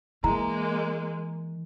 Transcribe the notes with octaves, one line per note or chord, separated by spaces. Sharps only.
E3 G#3 A#3 A#5